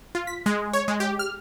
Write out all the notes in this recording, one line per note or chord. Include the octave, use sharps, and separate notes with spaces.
F4
B6
G#3
C#5
G#3
G4
F6